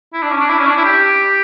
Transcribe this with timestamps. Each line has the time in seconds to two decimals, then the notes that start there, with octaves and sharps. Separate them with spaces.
0.13 E4
0.22 D4
0.32 C#4
0.40 D4
0.49 E4
0.58 C#4
0.67 D4
0.77 E4
0.84 G4